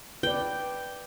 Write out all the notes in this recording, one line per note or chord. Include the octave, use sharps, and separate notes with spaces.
B4 D5 G5